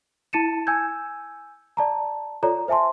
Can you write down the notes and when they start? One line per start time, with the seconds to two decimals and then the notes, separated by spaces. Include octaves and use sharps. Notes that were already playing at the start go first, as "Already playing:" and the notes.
0.33 E4 A5 A6 C#7 D#7 E7
0.67 G#5 E6 G6 G#6
1.77 D5 A5 A#5
2.43 F4 A4 C#5 D5 A#5
2.68 C5 E5 G#5 A5 C6